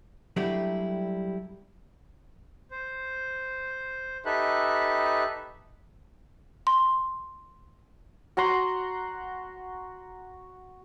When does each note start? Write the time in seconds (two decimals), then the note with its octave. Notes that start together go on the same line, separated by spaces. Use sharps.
0.36 F#3 G3 A3 D4 E4 G4
2.71 C5
4.26 D#4 G4 A4 B4 E5 F#6
6.67 C6
8.37 F#4 F#5 A#5 C6